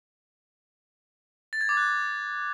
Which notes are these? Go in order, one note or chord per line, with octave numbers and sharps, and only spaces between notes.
A6
G#6
D6
F#6